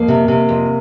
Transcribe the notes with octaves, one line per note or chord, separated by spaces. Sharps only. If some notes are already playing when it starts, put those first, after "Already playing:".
Already playing: F2 A#3
C3
C3
F2